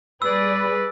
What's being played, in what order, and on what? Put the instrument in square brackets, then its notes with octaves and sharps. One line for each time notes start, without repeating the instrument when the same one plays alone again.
[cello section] G3 G#4 D5 [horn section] B4 [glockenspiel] E6